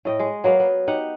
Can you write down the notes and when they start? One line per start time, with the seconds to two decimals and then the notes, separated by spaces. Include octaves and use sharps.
0.05 A2 D#5 G5
0.19 G#3
0.44 F#3 A#3 B3 F5
0.60 B3
0.88 D#4 G4 F#5